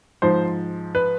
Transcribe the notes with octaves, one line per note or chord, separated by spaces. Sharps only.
G#2 F3 C5
B4